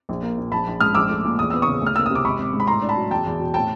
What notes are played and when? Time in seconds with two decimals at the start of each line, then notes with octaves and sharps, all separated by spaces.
0.09 A#1
0.23 A#3
0.38 A#2
0.52 A#1 A5 B5
0.67 A#1
0.80 G#2 D#6 F6
0.95 A#1 D6 E6
1.09 A3
1.25 A#2
1.39 E2 D#6
1.50 B3 E6
1.62 C#3 C#6 D#6
1.81 D2
1.87 F6
1.96 A#3 E6
2.06 D#6
2.10 C3
2.15 D6
2.25 G#1 B5 C#6
2.39 G#1
2.54 G#2
2.60 B5
2.67 A2 A#5 C6
2.82 D4
2.89 A5 B5
2.96 F#3
3.11 E2 G5 A5
3.26 E2
3.40 B2
3.54 A2 G5 A5